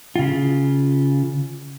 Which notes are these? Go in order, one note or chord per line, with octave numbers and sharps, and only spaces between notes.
C#3 F4